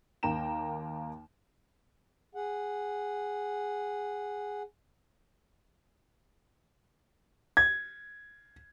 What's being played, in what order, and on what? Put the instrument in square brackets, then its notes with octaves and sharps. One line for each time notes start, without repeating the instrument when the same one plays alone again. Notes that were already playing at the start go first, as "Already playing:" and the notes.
[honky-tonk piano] D#2 A#3 G5 A#5 E7
[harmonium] G#4 F#5
[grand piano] G#6